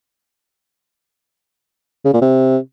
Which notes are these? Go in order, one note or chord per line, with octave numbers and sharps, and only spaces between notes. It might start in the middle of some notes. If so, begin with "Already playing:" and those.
C#3
A#2
C3